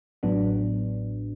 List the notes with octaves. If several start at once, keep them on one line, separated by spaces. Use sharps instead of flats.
A1 A2 F#3 B3 D4